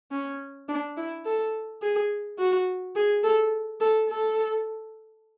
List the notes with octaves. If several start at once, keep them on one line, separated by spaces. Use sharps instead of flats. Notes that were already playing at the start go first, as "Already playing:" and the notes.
C#4
D4
E4
A4
G#4
F#4
G#4
A4
A4
A4